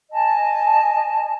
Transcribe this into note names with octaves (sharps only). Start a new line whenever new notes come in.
D#5 G#5 A5